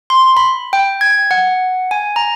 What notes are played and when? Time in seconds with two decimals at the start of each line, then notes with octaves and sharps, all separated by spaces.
0.10 C6
0.37 B5
0.73 G5
1.01 G#6
1.31 F#5
1.91 G#5
2.16 A#5